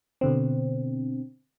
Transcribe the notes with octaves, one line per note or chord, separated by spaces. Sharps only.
B2 D3 C4